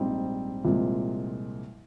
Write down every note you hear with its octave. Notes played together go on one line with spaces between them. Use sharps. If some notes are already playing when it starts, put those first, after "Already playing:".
Already playing: A#1 G#2 G3 C4 D#4
C2 A#2 F3 G#3 C4